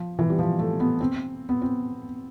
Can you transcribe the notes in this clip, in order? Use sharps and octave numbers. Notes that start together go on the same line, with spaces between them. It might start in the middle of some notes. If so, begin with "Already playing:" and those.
Already playing: F3
E3
G3
F3
A3
B3
C4
B3
C4